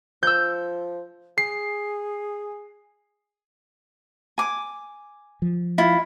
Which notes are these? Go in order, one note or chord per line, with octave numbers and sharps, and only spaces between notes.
F3 E6 G6
G#4 C7
G#5 D6
F3
E4 F4